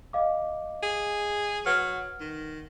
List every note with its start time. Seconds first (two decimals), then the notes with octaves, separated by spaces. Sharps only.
0.13 D#5 F5 D6
0.83 G#4
1.66 F#3 B4 F#5 F6
2.20 D#3